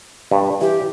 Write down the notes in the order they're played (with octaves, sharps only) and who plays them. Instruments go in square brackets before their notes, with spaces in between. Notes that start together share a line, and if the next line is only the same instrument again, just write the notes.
[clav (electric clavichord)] G2
[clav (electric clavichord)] E3 [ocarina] G4